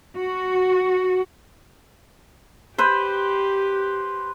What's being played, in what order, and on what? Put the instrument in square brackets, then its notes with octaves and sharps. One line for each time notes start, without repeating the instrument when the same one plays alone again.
[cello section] F#4
[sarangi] G4 [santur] B4 C5